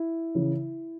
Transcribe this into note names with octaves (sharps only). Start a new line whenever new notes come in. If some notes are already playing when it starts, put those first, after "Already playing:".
Already playing: E4
C#3 E3